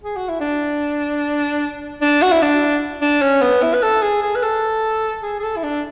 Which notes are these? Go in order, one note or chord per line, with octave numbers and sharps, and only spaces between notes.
G#4
F#4
E4
D4
D4
F#4
E4
D4
D4
C#4
B3
E4
B4
A4
G#4
G#4
B4
A4
G#4
G#4
A4
E4
D4